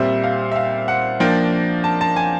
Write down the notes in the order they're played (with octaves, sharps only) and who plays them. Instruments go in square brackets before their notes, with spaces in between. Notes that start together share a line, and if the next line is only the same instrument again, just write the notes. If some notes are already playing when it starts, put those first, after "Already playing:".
Already playing: [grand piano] A#2 G3 C4 E5
F5
E5
F5
F#5
F3 A#3 D4 G5
A5
A5
G#5